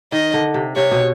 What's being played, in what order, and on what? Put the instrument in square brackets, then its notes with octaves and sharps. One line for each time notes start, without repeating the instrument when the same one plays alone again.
[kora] D#3 [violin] D#5
[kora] D3
C3
[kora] C3 [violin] C#5
[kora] B2